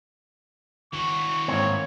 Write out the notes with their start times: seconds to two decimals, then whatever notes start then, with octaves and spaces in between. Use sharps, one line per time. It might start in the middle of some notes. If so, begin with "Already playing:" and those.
0.93 D#3 E3 F#4 C#6
1.48 G#2 A#3 C4 C#5